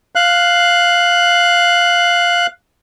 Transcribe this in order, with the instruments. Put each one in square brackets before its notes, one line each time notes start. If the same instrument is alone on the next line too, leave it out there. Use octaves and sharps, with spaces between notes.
[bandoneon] F5 F#6